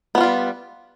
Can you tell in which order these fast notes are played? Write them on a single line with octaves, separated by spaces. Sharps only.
B3 F#4 F4 G3